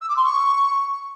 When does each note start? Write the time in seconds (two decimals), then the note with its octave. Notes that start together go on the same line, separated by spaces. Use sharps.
0.01 E6
0.08 D6
0.16 C6
0.24 C#6